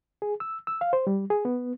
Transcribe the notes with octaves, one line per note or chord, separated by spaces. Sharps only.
G#4
E6
E6
F5
C5
G3
G#4
B3